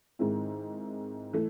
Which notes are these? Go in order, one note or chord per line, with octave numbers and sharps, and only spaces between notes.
G#2 D#3 G#3 C4 E4
E3 A3